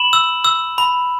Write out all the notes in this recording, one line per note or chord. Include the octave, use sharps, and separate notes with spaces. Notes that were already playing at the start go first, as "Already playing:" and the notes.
Already playing: B5 E7 F#7
E6
E6
B5